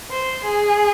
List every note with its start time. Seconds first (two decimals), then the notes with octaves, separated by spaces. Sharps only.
0.11 C5
0.44 G#4